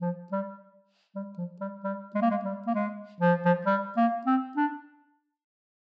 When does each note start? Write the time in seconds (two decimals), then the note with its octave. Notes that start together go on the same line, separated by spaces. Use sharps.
0.01 F3
0.32 G3
1.15 G3
1.38 F3
1.61 G3
1.84 G3
2.15 G#3
2.22 A#3
2.31 G#3
2.44 G3
2.67 A#3
2.74 G#3
3.21 F3
3.46 F3
3.66 G3
3.97 A#3
4.27 C4
4.57 D4